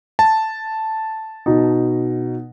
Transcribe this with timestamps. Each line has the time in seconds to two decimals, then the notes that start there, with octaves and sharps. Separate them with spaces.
0.19 A5
1.46 B2 D#4